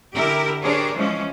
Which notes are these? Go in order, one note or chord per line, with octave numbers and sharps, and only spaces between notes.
D3 E4 G4 A#4
D4 G4 G#4 A#4 C5 C#5
E3 F3 G#3 C#4